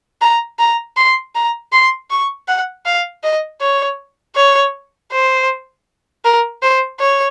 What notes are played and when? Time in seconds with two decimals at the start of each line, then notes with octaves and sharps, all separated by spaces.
0.22 A#5
0.59 A#5
0.97 C6
1.35 A#5
1.73 C6
2.10 C#6
2.48 F#5
2.86 F5
3.23 D#5
3.61 C#5
4.36 C#5
5.12 C5
6.25 A#4
6.62 C5
7.00 C#5